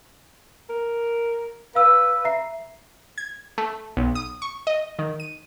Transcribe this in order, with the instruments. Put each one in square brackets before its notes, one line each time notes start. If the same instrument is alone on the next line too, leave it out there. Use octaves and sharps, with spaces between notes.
[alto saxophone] A#4
[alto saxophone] B4 [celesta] F5 E6
[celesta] E5 A#5 C7
[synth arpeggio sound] G#6
A3
B1
D#6
C#6
D#5
D#3
D#7